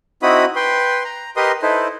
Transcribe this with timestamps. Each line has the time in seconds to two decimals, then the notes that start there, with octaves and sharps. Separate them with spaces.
0.22 C4 D#4 E4 F#4 B5 D#6
0.56 B4 G5 C6
1.05 A#5
1.36 G4 A#4 B4 D#5 C6 D#6
1.62 D#4 E4 A4 B4 C5